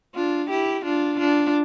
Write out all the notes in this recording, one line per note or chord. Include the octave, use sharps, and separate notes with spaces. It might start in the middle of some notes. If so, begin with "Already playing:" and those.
D4 F4
E4 G4
D4 F4
D4 F4